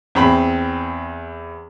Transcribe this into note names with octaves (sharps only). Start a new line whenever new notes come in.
E2 C4 B5